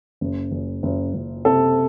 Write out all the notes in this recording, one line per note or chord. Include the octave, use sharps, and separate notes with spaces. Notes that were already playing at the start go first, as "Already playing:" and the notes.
F#1
F#1
F#1
F#1
C3 A4